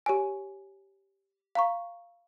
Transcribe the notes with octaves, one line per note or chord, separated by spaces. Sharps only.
G4 C#5 G#5
F5 A#5 C#6